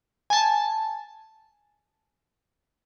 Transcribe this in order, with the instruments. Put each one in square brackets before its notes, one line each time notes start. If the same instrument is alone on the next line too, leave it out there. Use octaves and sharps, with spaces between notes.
[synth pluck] G#5 A5